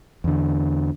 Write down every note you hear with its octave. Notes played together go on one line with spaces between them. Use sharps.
E2 D3